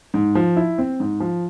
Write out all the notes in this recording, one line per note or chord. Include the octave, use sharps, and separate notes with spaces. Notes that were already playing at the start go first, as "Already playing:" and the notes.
G#2
F3
E4
C4
G#2
F3